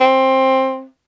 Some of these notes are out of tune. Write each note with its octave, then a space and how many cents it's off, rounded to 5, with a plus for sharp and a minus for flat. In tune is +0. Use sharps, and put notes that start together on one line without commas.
C4 +15